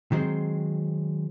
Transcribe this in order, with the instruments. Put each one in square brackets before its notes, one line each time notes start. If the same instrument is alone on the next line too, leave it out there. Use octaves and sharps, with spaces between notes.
[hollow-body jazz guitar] D#3 F#3 G#3 C4